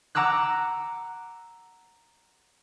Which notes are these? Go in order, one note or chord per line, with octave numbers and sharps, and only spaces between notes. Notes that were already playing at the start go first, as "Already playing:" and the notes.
F#5 A#5 D6 E6 F#6